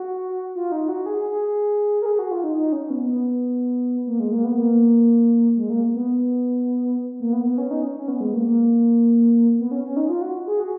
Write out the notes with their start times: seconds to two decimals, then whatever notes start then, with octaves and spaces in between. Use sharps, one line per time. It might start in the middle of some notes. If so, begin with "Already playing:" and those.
Already playing: F#4
0.55 F4
0.72 D#4
0.89 F#4
1.06 G#4
1.31 G#4
2.02 A#4
2.06 G#4
2.19 F#4
2.31 F4
2.44 D#4
2.56 D#4
2.72 C#4
2.90 B3
3.06 B3
4.07 A#3
4.19 G#3
4.32 A#3
4.44 B3
4.58 A#3
5.57 G#3
5.70 A#3
5.94 B3
7.20 A#3
7.33 B3
7.45 B3
7.58 C#4
7.71 D#4
7.83 C#4
7.96 C#4
8.08 B3
8.21 G#3
8.34 A#3
8.46 A#3
9.59 B3
9.71 C#4
9.84 C#4
9.96 D#4
10.09 F4
10.21 F#4
10.47 G#4
10.60 F#4